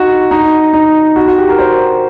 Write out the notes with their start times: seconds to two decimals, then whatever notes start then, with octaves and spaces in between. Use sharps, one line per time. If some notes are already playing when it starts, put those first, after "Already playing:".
Already playing: D#4 F#4
0.31 D#4
0.73 D#4
1.16 F#4
1.27 F#4
1.38 G4
1.49 A#4
1.59 C5